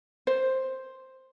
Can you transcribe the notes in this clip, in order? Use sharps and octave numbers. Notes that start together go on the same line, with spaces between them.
C5